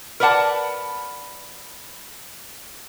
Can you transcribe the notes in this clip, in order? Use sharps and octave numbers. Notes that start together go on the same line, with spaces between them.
A#4 B4 D5 F#5 A5